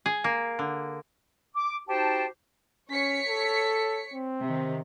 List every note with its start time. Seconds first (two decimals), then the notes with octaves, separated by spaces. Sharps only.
0.06 G#4
0.24 A#3
0.59 D3
1.55 D6
1.88 D#4 F#4 G4 C5 G5 A5
2.90 C#4 C#5 B6 C#7
3.28 A4
4.13 C4
4.43 C3 D#3